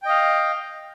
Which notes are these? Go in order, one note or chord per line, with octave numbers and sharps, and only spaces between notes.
D#5 F5 G5